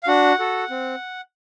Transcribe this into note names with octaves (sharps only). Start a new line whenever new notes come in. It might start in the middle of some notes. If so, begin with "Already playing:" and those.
F5
D4 F#4 F#5
F#4 A4
C4